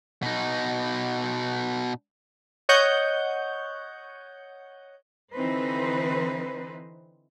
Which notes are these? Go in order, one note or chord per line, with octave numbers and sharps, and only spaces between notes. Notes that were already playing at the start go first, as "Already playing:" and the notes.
B2 D#4
C#5 D#5 F#5 C#6 G6
D3 E3 C4 D#4 B4 C5